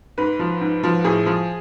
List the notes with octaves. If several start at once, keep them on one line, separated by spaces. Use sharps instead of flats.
G#2 B4
F3
G#2
F3
A2 G#4
F3